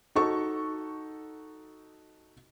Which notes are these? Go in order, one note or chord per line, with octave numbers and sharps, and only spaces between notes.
D#4 F#4 A4 C#6